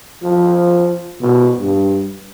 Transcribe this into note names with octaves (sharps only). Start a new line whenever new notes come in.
F3
B2
G2